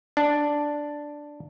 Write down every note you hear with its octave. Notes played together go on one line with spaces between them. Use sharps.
D4